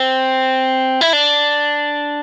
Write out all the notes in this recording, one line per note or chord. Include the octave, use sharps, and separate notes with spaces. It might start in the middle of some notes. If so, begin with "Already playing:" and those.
Already playing: C4
E4
D4